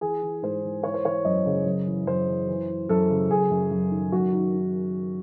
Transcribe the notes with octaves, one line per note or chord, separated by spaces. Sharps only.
E3 G#4
E3
G#2 C5
E3
E3 C#5
C5
E3 C#5
F#2 D#5
C#3
F#2
E3
F#2 C5
E3
E3
E3
F#2 A4
C#3
F#2 G#4
F#2
F#2
D#3
F#2 F#4
D#3
D#3